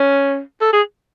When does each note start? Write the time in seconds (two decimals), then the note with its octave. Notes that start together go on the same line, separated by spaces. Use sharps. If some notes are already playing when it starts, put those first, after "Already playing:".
Already playing: C#4
0.61 A4
0.73 G#4